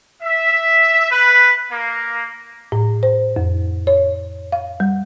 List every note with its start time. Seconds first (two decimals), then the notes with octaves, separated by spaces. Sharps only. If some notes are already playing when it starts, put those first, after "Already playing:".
0.22 E5
1.10 B4
1.71 A#3
2.72 A2
3.03 C5
3.36 F2
3.87 C#5
4.52 F5
4.80 G3